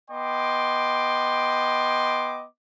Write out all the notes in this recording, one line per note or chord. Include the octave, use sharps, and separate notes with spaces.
B3 D#5 G5 C6 D6